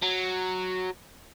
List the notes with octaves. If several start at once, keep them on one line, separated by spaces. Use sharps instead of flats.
F#3